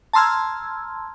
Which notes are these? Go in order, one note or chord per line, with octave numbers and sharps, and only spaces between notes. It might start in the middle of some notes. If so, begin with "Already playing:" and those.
A5 A#5 C6 E6 F6 G#6